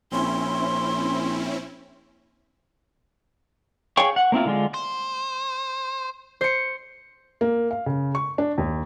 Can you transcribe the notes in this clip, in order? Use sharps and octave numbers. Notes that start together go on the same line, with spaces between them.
A#1 C4 C#4 E4 C6
G#4 C#5 F5 G5 C#6
F#5
A#3 C4 E4 F4
D3 G#3 F4
C5
C5 C#7
A#3
F5
C#3
C#6
D4
D#2